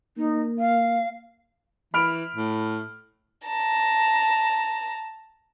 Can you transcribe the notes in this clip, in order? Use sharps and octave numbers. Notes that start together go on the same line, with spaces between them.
A#3 D#4
F5
E3 B5 F6 D7
A2
A5 A#5